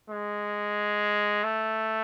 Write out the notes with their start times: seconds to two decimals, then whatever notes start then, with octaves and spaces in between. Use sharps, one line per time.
0.10 G#3
1.44 A3